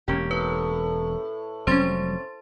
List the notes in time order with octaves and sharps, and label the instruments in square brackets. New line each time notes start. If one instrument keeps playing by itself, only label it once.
[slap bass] E1 [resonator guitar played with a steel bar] A#3 C#4 G4
[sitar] A2 [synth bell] B4
[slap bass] F1 F#3 G3 [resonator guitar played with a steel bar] C4 C#4 [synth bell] C5 C6 A6